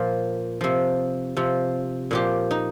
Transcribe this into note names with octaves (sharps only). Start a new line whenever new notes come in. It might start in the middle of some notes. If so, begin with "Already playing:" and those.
Already playing: A#2 F3
C3 F3
C3 F3
A#2 F3 G4
D#4